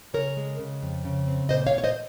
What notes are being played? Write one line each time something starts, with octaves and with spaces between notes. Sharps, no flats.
C#3 A#4 C#5
G#3
C#3
F2
C#3
C4
A#2 C5 D#5
C#5 F5
A#2
C#5
C5 D#5